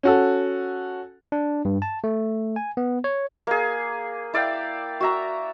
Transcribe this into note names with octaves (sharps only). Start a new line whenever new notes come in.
C#4 F#4 A4
D4
G2
A5
A3
G#5
B3
C#5
A#3 G#4
E4 D5 F5 G5
F#4 E5 A#5